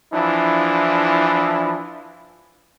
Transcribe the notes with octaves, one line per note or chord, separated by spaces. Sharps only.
E3 F3 D4 E4